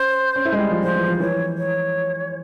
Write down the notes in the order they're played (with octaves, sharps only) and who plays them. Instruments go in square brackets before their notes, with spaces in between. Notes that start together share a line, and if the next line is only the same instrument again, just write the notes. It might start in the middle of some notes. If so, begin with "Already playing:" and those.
Already playing: [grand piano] C#4 [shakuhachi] C5
[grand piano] C#4
E4
G#3
G3
F3
[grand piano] F3 [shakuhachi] C5
[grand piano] E3
F3
[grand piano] E3 [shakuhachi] C#5
[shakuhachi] C#5